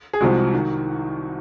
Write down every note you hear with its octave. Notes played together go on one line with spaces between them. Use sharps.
G#4
C2 C3 F3 G#3 F#4
D#3